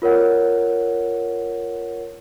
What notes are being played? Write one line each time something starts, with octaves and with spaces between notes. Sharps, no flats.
F4 A#4 C#5 F#5